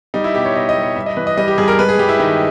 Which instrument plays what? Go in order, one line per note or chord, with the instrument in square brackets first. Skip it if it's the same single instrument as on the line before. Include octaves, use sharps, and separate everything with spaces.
[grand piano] G3 D#4
E4
B2 G4
C#5
B2 D#5
D#5
G3
C#5
G2 E5
D#5
E3 B4
D#5
G3 D#5
G4
G2 G#4
A#4
G#3 B4
G#4
G2 G4
E4
D#3 D#4